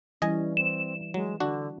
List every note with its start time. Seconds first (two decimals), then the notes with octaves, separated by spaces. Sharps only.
0.22 E3 G3 C#4 D#5 G#5
0.57 C4 E7
1.14 F#3 G#3
1.40 D3 D4 F#4